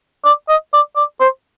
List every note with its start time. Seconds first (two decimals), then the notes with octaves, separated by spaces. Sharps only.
0.25 D5
0.49 D#5
0.73 D5
0.96 D5
1.21 C5